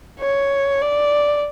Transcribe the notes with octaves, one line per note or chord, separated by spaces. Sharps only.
C#5
D5